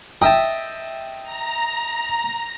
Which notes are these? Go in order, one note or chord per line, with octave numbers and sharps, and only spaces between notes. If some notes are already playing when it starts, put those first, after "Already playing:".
D#5 E5 G5 A5
A#5